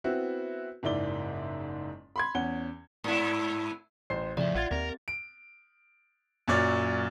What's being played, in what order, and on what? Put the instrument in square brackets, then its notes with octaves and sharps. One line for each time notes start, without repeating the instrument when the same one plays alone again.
[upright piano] B3 C4 E4 F#4
F#1 G#2 E4 D5 G7
B5 C6 G#6
E2 C#4 F#5 G7
[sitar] G#2 E4
[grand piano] A1 C5 C7
[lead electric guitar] F2 [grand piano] A2 [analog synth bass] C#3 [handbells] D5 E5
[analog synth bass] A#1 [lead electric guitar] F4 [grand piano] F#5 G#6 A6
[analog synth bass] D#2 [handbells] C4 G4 [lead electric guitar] A#4
[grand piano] D7
F#2 A#2 F#3 C#5 D5 A6